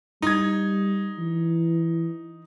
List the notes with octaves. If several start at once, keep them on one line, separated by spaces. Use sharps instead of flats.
G3 D#4 G#6
E3